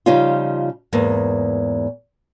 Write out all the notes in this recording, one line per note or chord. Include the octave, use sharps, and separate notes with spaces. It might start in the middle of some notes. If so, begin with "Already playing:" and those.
C#3 F3 G3 C#4 D#4 F4
E2 G#2 A#3